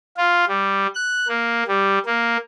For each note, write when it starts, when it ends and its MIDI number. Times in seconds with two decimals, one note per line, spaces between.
0.17 0.45 65
0.48 0.87 55
0.95 1.27 90
1.28 1.63 58
1.67 1.98 55
2.06 2.37 58